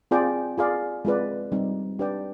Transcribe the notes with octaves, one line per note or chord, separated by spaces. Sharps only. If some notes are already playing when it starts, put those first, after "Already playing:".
C4 F4 G#4 D5 G5
F4 G#4 D5 F5
G#3 C4 F4 B4 D5
G3 C4 D#4
D4 G4 B4 D5 G5